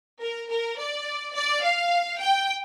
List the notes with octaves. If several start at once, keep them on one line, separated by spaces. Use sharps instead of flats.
A#4
A#4
D5
D5
F5
G5